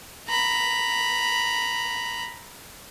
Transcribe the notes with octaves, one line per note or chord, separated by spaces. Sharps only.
A#5 B5